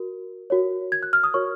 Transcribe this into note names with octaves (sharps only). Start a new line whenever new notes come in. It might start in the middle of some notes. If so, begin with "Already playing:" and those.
Already playing: F#4 A#4
F#4 A#4 C#5
G#6
F#6
F6
D#6
F#4 A#4 C#5 C#6